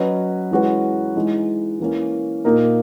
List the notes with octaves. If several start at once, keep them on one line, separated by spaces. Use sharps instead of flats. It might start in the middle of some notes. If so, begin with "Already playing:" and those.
Already playing: F#3 C#4 F#4 B4 D#5
E3 G#3 C#4 F#4 B4
E3 G#3 D#4
E3 A#3 C#4
A#2 A#3 D#4 A#4